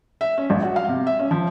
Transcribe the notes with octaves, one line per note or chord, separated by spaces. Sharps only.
E5
C#4
A#1
F#4
F5
C3
E5
C#4
F3